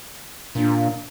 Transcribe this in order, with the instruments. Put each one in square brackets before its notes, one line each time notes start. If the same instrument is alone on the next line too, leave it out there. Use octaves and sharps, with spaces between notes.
[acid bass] A#2 [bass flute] D4